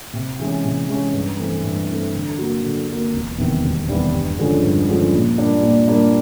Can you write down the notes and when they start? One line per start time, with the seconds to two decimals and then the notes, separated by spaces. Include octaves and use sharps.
0.13 C3
0.39 E3 G#3 C#4
0.65 C3
0.88 E3 G#3 C#4
1.13 G2
1.39 E3 A3 C4
1.64 G2
1.88 E3 A3 C4
2.14 D3
2.38 F#3 A#3
2.64 D3
2.89 F#3 A#3
3.13 E1
3.38 E2 C3 D#3 G3
3.63 E1
3.89 E2 C3 D#3 G3
4.13 G2
4.38 D3 F3 G#3 C#4
4.64 G2
4.88 D3 F3 G#3 C#4
5.13 A#2
5.38 G3 A#3 D4
5.63 A#2
5.88 G3 A#3 D4